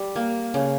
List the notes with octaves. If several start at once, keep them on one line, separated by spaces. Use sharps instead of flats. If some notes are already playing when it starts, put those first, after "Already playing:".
Already playing: G3
A#3
C#3